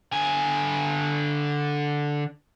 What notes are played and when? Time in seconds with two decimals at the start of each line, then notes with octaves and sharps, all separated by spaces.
0.13 D3 G#5